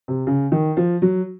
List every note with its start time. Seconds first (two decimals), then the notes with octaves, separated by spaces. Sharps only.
0.08 C3
0.27 C#3
0.52 D#3
0.77 F3
1.02 F#3